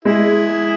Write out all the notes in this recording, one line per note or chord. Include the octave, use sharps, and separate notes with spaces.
G#3 E4 G#4